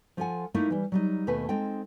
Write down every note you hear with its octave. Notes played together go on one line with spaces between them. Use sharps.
F3 F4 A4 D5 F#5 G#5
A3 A#3 D#4 E4 A#4 E5
E3 G3
F#3 G3 D#4
D#2 B2 A3 B4 G#5
G#3 C4 D#4 A4 G5